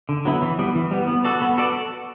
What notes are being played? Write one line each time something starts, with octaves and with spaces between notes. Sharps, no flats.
D3
F#3 B3 E4
E3
G3 B3
E3
G3 B3
B3
F#4 A4 D5
B3
F#4 A4 D5